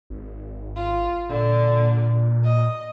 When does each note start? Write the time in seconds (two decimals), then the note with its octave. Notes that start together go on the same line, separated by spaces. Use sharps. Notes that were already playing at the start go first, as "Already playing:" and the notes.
0.10 G#1
0.76 F4
1.30 A#2 D3
2.44 D#5